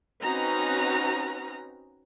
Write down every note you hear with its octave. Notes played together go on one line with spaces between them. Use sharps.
C4 C#4 D#4 F#4 B4 A#5